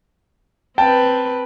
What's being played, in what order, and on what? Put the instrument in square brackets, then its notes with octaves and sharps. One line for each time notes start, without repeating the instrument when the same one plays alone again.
[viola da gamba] C4 B4 [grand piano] G5 A5